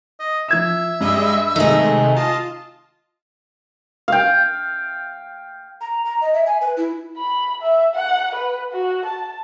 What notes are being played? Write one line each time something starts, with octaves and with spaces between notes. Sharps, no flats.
D#5
F3 E5 G#6 E7
G2 G3 G#3 D#5
C3 D#3 G#3 A3 D#4 G#4
F4 D#5 A5
F5 G5
A#5
A#5
D#5
E5
G#5
B4
E4
B5
E5
F#5
B4
F#4
A5